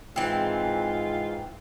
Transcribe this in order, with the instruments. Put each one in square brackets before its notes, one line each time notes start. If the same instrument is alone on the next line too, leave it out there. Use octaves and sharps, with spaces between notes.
[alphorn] G#2 [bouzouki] E3 C4 [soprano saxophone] F4